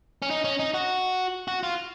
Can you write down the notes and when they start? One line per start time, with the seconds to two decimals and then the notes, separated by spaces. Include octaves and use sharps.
0.22 C#4
0.30 D#4
0.44 C#4
0.59 D#4
0.74 F#4
1.48 F#4
1.63 F4